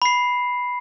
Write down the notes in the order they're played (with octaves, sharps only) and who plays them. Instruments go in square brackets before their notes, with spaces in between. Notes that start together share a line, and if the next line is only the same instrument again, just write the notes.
[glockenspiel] B5 C7